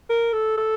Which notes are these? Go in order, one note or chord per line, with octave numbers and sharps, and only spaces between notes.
A#4
A4
A4